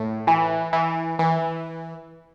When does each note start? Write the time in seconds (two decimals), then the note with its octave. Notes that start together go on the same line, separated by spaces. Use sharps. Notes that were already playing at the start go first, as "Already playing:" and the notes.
Already playing: A2
0.27 E3
0.73 E3
1.19 E3